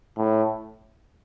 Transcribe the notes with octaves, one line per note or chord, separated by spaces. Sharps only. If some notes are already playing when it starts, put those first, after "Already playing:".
A2